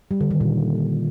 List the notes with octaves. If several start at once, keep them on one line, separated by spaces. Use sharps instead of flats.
G3
D3
D#3
A#2